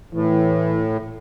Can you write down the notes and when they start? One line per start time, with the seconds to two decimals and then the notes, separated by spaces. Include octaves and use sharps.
0.13 A2 E3